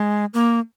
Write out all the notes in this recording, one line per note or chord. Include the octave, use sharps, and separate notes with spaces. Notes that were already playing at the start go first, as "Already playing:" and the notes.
Already playing: G#3
A#3